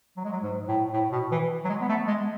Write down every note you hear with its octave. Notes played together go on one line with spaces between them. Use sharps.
F#3
G#3
F#3
G#2
A2
A2
B2
E3
F#3
G#3
B3
A3
G#3